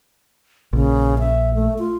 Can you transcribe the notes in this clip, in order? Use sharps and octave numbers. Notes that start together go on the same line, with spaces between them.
A#1 C#3
E5
A3
F4